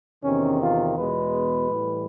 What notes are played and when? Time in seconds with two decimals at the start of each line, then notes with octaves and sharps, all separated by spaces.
0.23 E2 C3 D#3 C#4
0.60 F4
0.96 E2 B2 G#3 B4
1.70 A2 E3 G3